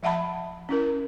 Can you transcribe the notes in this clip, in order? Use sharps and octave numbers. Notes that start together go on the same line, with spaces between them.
F3 E5 F#5 A5 B5
C#4 E4 A#4